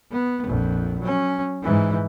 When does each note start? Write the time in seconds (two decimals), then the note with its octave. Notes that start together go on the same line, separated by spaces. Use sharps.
0.11 B3
0.46 A#1 F2
1.01 F#3 C#4
1.62 G#2 E3